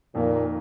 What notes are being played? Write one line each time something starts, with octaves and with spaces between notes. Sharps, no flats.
F2 A#2 D#3 A#3